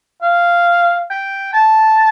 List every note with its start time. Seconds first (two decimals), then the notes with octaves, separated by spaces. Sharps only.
0.22 F5
1.10 G5
1.54 A5